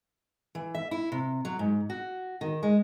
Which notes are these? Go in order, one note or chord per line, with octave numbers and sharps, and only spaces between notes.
E3
E5
E4
C3
F#3
G#2
F#4
D#3
G#3